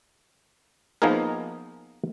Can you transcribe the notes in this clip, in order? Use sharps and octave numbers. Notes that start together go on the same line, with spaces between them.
F3 A#3 B3 D#4 G#4 A#4